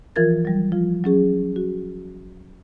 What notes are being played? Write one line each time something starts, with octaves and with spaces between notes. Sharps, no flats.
E3 F3 F4 A#4 G#6 A6
F#3 G3
F3 F4
F#3 C#4 G#4
F#4